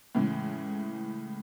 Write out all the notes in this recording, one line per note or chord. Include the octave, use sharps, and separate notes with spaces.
A2 C#3 E3 G#3